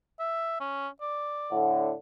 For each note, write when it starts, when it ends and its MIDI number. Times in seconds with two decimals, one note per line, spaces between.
0.20 0.60 76
0.60 0.88 61
1.01 1.62 74
1.51 1.93 45
1.51 1.93 50